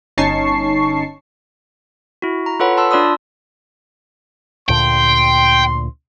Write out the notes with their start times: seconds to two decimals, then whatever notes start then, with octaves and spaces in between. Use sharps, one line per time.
0.18 G1 C#4 D#4 A5 C#6 C7
2.22 E4 F#4
2.46 A#5
2.60 F4 A4 B4 C#5 F#5 B5
2.77 A5 C6 E6
2.91 D4 F4 D5 B5 D#6 E6
4.69 D2 A#2 D3 G5 C6